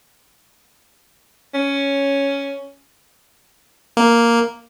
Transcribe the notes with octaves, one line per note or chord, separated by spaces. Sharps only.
C#4
A#3